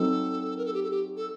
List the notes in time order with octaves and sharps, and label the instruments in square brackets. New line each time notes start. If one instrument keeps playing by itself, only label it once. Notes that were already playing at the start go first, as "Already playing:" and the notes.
Already playing: [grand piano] F#3 C4 D#4 [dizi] A4
[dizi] A#4
A4
G4
A4
G4
A4